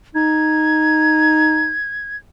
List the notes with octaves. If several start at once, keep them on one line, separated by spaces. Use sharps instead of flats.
D#4 G#6